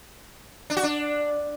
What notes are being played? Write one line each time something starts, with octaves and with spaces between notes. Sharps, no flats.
D4
F#4
D4